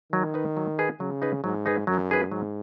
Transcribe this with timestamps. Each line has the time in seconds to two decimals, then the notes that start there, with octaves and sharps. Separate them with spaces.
0.12 D#3 F#3
0.34 D#4 B4
0.57 F#3
0.79 D#4 G#4 B4
1.00 C#3 F#3
1.22 D#4 G#4 B4
1.44 G#2 F#3
1.66 D#4 G#4 B4
1.87 F#2 F#3
2.10 D#4 G#4 B4
2.31 G#2 F#3